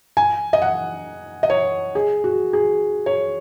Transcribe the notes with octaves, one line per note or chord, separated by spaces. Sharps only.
G#5
D#5
F#5
D#5
C#5
G#4
F#4
G#4
C#5